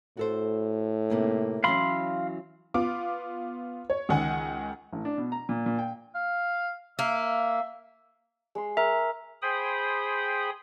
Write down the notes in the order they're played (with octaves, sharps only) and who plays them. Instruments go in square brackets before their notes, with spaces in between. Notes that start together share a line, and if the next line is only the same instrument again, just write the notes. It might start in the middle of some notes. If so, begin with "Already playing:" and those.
[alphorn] A2 [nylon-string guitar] F#4 A4 C5
[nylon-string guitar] C3 A#3 D#4
[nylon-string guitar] E3 F#3 C#4 [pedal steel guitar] F5 B5 C6
[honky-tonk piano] B3 F4 D6
C#5
C#2 D#3 F#5 G#5
[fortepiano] A1
D4
B2
A#5
A#2
A#2
G5
[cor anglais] F5
[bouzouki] A#3 [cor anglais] E5
[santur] G#3 C6
[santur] A#4 [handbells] E5
[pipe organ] G#4 C5 G5 B5 D#6